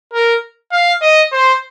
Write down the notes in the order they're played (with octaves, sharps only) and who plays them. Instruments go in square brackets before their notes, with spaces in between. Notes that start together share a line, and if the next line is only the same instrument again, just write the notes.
[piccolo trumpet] A#4
F5
D#5
C5